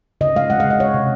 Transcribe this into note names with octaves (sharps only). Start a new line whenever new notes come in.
C#3 D#5
G#3 F5
G#3 F#5
F5
C#3
D#5
G#3 C#5
C3